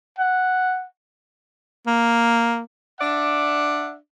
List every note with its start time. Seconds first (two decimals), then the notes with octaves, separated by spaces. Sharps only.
0.18 F#5
1.87 A#3
3.00 D4 D5 E5 F#5